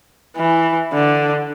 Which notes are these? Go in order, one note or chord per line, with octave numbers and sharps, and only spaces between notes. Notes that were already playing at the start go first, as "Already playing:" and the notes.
E3
D3